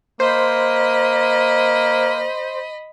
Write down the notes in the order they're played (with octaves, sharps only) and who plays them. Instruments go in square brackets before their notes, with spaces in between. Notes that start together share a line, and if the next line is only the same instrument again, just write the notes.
[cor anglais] A#3 [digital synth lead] C5 [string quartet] D#5 B5